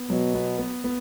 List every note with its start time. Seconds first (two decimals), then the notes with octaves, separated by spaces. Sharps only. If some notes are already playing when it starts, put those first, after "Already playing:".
Already playing: B3
0.10 B2 F#3
0.34 B3
0.59 B3
0.84 B3